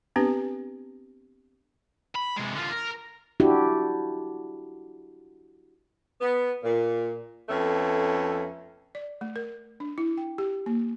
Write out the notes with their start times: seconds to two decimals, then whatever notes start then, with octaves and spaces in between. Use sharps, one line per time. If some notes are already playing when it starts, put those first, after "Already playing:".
0.16 B3 C4 D4 G4 B4
2.15 B5
2.36 C3 G#3
2.55 D3 F4
2.71 A#4
3.40 D4 E4 F#4 G4
6.20 B3
6.63 A#2
7.49 F2 A3 B3 C#4 A4
8.95 D5
9.21 A3
9.36 A#4
9.80 D4
9.98 E4
10.18 G5
10.38 G4
10.66 A#3